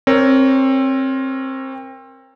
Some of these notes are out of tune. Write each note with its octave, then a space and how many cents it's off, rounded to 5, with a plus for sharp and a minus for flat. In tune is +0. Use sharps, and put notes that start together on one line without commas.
C4 +25 A#4 +0 C#5 +15